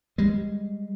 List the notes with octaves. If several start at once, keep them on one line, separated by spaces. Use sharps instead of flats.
G3 G#3